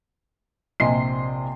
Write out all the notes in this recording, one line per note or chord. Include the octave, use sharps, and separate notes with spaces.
A#1 C3 D#5 G#5 C6 C7